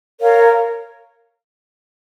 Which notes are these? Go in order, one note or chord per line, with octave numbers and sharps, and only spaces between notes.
A#4 C#5 F5